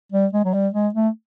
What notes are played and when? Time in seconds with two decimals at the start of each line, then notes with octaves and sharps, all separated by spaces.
0.12 G3
0.33 G#3
0.45 F#3
0.54 G3
0.74 G#3
0.94 A3